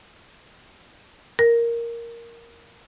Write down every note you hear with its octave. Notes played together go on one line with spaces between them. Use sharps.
A#4